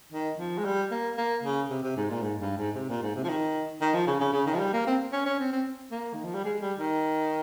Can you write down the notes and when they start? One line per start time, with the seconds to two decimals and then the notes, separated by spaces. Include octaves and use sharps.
0.12 D#3
0.38 F3
0.58 G#3
0.65 G3
0.91 A#3
1.18 A#3
1.43 C#3
1.70 C3
1.83 C3
1.97 G#2
2.10 A#2
2.23 G#2
2.41 G2
2.58 G#2
2.75 C3
2.89 A#2
3.02 G#2
3.15 C3
3.24 F3
3.29 D#3
3.81 D#3
3.94 F3
4.07 C#3
4.20 C#3
4.33 C#3
4.46 D#3
4.54 F3
4.59 G3
4.73 A#3
4.87 C4
5.13 C#4
5.26 C#4
5.39 C4
5.52 C4
5.91 A#3
6.14 D#3
6.24 F3
6.35 G3
6.45 G#3
6.62 G3
6.79 D#3